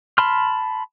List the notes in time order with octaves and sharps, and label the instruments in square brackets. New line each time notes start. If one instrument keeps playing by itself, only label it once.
[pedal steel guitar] A5 B5 C6 F6